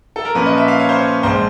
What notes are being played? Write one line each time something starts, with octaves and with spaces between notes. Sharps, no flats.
A4
A#4
A#2 F3 A#3 C#4 B4
D#5
E5
F5
C#5
C5
C#5
A#1 F3 G#3 C5